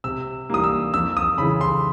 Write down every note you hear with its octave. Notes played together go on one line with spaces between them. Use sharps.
C3 E6
E3 G3 A#3 D#6
E6
F2 E6
D#6
C#3 E3 B5
C6